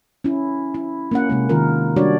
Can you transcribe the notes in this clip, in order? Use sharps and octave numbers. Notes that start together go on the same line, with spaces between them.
C#4 E4
E4
A#3 C#4 F#5
C3 G#3 A#3
D#3 F4 A#4
G3 D4 F#4 C#5 D5